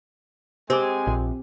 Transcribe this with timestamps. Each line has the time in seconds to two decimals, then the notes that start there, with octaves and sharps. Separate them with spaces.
0.70 G#3 C4 G4 G#5 D6
1.07 A#1